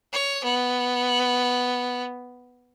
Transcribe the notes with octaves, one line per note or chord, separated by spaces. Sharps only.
C#5
B3